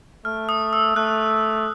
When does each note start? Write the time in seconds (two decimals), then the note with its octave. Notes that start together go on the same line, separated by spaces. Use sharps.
0.25 A3 F6
0.49 D#6
0.73 E6
0.96 A3 F#6